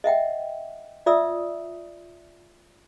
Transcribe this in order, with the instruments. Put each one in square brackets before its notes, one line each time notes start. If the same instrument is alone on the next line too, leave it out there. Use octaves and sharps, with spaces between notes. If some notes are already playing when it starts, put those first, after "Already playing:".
[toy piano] D#5 E5 F#5 G5
F4 D5 E5 D#6 E6